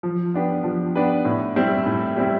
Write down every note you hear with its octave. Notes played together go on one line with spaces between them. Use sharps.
F3
B3 D4 G4 B4
F3
B3 D4 G4 B4
A2
G3 C4 E4 G4
A2
G3 C4 E4 G4